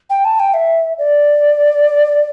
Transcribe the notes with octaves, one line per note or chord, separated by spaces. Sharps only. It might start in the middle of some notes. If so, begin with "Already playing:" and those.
G5
A5
G5
E5
D5